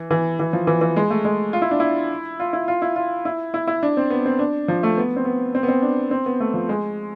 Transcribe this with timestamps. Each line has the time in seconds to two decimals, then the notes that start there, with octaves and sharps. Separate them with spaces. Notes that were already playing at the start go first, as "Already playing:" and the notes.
Already playing: E3
0.11 E3
0.40 E3
0.53 F3
0.67 E3
0.81 E3
0.96 G#3
1.10 A3
1.25 G#3
1.53 F4
1.62 E4
1.71 D4
1.80 E4
2.40 F4
2.53 E4
2.68 F4
2.82 E4
2.96 F4
3.25 E4
3.54 E4
3.68 E4
3.83 D4
3.97 C4
4.10 B3
4.26 C4
4.39 D4
4.68 F3
4.83 A3
4.98 B3
5.16 C4
5.25 B3
5.55 C4
5.63 B3
5.68 C4
5.82 D4
6.11 C4
6.26 B3
6.40 A3
6.54 F3
6.69 G#3